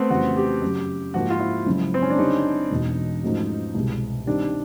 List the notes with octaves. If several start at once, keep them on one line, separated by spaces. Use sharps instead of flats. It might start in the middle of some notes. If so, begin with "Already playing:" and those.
Already playing: A3 B3 C4
F2 C#3 E3 G3 F#4
G4
F#2 C#3 F#3
G#2 F3 A#3 F#4
F4
E4
F#1 F#2 C#3 F3 G#3
C4
C#4
D4
D3 G3 C4 D#4
E1 E2 B2
G#2 F3 A3 C#4 F#4
C2 B2 G#3
D#3 G3 C4 D4